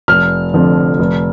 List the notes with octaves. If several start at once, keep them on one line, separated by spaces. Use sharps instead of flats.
F1 F6
F2 D3 F3
F1